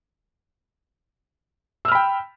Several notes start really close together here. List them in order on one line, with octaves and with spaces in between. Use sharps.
E6 F6 B5 G5